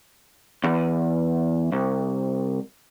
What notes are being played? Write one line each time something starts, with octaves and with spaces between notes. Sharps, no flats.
E2
C2